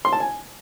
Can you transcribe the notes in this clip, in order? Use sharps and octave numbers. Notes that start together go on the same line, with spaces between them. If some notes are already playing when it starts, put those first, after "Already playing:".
C6
A5
G#5